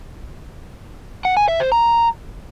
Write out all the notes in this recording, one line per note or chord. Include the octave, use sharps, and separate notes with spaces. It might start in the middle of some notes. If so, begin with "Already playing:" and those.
F#5
G#5
E5
C5
A#5